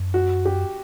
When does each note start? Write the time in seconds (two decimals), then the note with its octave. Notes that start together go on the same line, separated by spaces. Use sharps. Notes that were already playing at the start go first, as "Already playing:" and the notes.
Already playing: F#2
0.14 F#4
0.45 G4